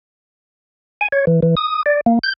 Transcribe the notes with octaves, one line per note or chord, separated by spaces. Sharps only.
G#5
C#5
E3
E3
D#6
D5
A#3
G6